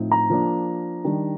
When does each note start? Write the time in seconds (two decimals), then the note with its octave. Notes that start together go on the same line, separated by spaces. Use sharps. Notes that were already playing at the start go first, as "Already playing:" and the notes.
Already playing: A2 F3 C4 D#4
0.12 A#5
0.30 F3 A#3 D4
1.04 D#3 G3 D4